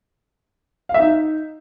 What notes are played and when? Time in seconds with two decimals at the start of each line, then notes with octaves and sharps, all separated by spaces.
0.89 F5
0.94 E5
1.00 D#4